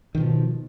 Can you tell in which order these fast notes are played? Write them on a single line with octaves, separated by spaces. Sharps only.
D#3 B2 F3